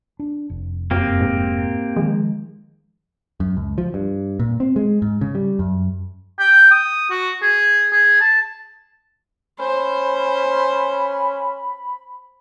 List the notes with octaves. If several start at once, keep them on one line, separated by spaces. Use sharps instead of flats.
D4
F1
F#2 A#3 C4 G4
G#2
D#3 F3 G#3
F#2
C#2
F3
G2
A#2
C4
G#3
G#2
C#3
G3
F#2
G5
D#6
F#4
G#4
G#4
A5
C#4 C5 B5